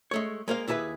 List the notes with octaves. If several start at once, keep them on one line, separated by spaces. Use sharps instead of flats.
G#3 A3 C#5
G#3 A#3 C5 F5
D#2 E4 G#4 A4 B4 E5